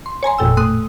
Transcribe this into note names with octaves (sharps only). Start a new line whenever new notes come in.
C6
C#5 G#5 A#5 C6
G1 F2 A#2 A4 G5 E6
A2 A3 C6 D#6 F#6 D#7